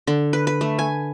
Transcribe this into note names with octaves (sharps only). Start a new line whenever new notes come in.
D3
B4
B4
A3
G#5